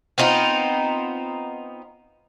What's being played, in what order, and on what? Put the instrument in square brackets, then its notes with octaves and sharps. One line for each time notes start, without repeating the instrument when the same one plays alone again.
[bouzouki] B3 C4 D#4 F4